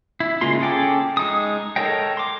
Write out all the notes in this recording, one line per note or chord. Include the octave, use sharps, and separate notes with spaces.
E4
C#3 G#3 A#3 F4 C6
C#4 G#4 A4 G5 D6
G#3 D#4 D#6
A4 A#4 C#5 D#5 G5
C6 D6